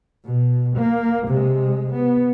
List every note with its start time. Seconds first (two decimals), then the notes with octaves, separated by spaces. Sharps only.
0.24 B2
0.76 A#3
1.27 C3 G#3
1.93 B3